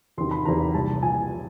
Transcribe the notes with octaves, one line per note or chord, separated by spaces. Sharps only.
E2 C3 D#3 F#3 C6
B5
E2 C3 D#3 F#3 A#5
C2 A#2 F3 A5
A#2 F3 G#5